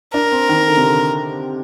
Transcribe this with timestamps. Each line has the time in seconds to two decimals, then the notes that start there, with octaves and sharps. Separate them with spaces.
0.13 D4 A#4
0.32 C4
0.49 D#3
0.67 D3
0.77 C3
0.86 D3